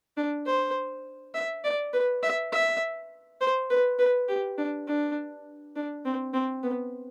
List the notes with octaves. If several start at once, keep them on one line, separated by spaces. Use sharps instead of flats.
D4
C5
E5
D5
B4
E5
E5
C5
B4
B4
G4
D4
D4
D4
C4
C4
B3